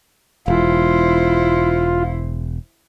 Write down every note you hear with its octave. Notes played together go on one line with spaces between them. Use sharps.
E1 E4 F4 C5